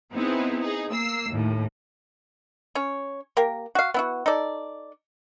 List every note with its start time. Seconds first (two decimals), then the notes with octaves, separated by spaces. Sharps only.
0.12 B3 C4 D#4 E4 G#4
0.60 D#4 G#4
0.90 A#3 E6 C7
1.30 D#2 A2
2.75 C#4 C#5
3.37 A#3 G4 A#4
3.75 F#4 F5
3.94 B3 E4 F#4
4.26 D#4 A4 D5